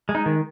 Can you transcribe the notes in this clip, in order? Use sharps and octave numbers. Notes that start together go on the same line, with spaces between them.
G#3
D#4
D#3